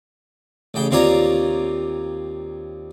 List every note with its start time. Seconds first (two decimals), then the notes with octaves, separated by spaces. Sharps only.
0.74 A1 C#3 G5
0.91 D#2 C4 F4 C#5 D5 A#5